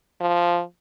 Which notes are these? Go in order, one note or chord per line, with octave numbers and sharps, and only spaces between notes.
F3